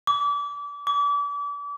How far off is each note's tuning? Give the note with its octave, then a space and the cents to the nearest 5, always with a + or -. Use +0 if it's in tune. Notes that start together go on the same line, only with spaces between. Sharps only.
D6 -30
D6 -35